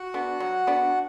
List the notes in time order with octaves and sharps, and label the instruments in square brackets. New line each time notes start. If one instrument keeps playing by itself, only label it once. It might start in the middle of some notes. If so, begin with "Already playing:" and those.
Already playing: [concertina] F#4 F#5
[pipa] B3 D4
F#3
B3 D4